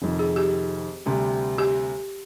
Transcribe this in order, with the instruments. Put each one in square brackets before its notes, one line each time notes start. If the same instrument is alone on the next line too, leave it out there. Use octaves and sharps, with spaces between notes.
[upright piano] F1 F2 D#3
[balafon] G#4
G4
[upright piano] D2 C3 G3
[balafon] G4